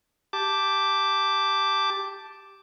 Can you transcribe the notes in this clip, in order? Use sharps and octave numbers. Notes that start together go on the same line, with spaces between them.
G4 A5 D6